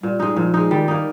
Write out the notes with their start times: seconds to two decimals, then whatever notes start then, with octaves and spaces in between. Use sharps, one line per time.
0.03 A#2 G3
0.20 G#3 D#4
0.36 A#2 F3
0.54 G#3 D#4
0.71 D#3 G3
0.88 A#3 D#4